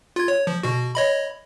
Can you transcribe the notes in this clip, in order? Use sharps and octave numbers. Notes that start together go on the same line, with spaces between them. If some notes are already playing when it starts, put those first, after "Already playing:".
F4 G#6
C#5
F3
B2 F#4
C#5 D#5 B5